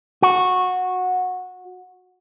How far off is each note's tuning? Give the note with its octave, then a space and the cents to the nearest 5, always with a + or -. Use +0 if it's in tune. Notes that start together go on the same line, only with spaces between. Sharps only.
F#4 -15